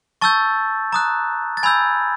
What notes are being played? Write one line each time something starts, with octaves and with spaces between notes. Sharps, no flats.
A5 C#6 E6 G6 A6
A#5 D#6 F#6
A6
G#5 B5 E6 G6 G#6